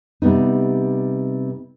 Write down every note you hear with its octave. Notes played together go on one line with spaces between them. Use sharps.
C3 G3 B3 D#4